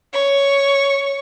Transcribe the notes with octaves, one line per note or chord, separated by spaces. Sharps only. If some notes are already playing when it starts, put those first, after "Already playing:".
C#5 C#6